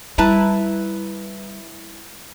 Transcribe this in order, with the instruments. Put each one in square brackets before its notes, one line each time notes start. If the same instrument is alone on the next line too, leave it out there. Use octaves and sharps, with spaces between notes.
[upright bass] G3 [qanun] E4 [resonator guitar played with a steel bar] B4 A5 A#5